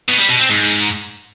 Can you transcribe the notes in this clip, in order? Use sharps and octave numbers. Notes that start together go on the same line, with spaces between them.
B2
G3
B2
C4
G#2